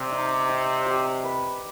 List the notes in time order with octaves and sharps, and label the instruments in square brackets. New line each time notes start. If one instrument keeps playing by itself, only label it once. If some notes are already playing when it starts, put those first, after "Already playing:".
Already playing: [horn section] C3 [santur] D5
[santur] D#4
D#4
G4
B4